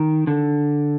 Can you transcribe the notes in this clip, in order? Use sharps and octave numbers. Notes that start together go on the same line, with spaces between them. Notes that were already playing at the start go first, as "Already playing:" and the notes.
Already playing: D#3
D3